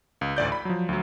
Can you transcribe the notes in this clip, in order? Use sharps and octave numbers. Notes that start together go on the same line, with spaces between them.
C#2
A1 D2 D5 G6
B5
F3 F#3
D2 F#3